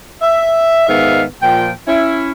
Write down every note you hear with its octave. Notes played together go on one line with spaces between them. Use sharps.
E5
G#2 D#3 B3 E5 F5
A#2 F3 G5
C#4 E4